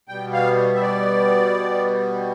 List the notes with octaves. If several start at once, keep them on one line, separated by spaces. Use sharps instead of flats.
B2 G3 B3 G5
F5
E5
D5